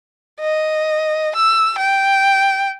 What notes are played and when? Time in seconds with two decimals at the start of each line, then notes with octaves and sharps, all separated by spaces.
0.40 D#5
1.36 E6
1.78 G5